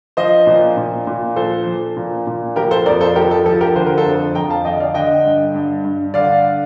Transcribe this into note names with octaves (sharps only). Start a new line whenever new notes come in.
F3 C5 D#5
A#2
A#2
A#2
F3 A4 C5
F3
A#2
A#2
F3 G4 A#4
A4 C5
F2 A#4 D5
A4 C5
F3 G4 A#4
A4
F3 A4
G4 A#4
D3 C5
A#4
A4 C5
F2
F2 G5 A#5
F5 A5
D3 D#5 G5
D5 F5
D3 D#5 G5
G2
G2
G2
D3 D5 F5